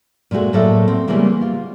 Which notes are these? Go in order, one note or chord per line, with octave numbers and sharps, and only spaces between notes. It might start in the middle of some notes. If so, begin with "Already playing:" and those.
A#2 G#3 A3 F#4 G#4
A2 F#3 A#3 A4 D5 E5
C4
C#3 E3 G3 G#3 A#3 B3
F4